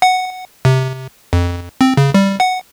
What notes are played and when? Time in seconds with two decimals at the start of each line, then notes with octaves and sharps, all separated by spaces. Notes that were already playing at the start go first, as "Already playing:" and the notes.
0.02 F#5
0.65 C3
1.33 F2
1.81 C4
1.97 C#3
2.14 G3
2.40 F#5